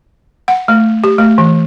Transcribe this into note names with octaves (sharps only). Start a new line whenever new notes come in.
F#5
A3
G4
A3
E3